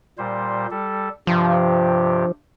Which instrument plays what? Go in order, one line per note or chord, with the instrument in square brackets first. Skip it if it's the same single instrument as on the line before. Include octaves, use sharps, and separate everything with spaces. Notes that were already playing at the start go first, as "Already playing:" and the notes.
[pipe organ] A#2 G3 C5
G3 A4
[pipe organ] G2 C3 G4 [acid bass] F3